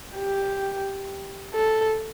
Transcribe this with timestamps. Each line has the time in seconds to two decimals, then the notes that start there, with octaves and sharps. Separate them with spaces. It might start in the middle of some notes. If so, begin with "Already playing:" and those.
0.17 G4
1.54 A4